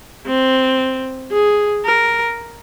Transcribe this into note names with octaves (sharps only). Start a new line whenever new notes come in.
C4
G#4
A#4